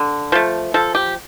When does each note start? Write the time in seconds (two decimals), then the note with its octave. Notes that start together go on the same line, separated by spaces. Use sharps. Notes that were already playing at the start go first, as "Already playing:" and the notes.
Already playing: D3
0.32 F3 A3
0.74 F3 A4
0.95 G4